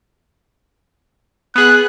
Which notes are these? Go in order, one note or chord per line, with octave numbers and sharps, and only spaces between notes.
B3 G#4 F#6